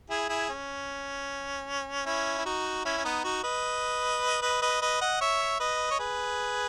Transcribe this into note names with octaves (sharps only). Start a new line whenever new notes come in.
E4 G#4
E4 G#4
C#4
C#4 E4
E4
D#4 F#4
C#4 E4
C#4
B3 D#4
D#4 F#4
B4 D#5
B4 D#5
B4 D#5
B4 D#5
D#5 F#5
C#5 E5
B4 D#5
C#5
G#4 B4